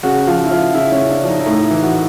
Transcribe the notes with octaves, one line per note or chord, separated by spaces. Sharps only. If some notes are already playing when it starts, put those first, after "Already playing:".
C#3 F#4
F3 F4
E4
F3 F4
C#3 E4
C#4
C#3
D4
F3
D#4
E4
A2 D#4
E4
E3
F#4